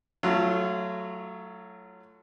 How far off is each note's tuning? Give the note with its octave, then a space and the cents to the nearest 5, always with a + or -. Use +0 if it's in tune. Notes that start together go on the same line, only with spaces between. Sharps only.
F#3 +0 A3 +0 F4 -30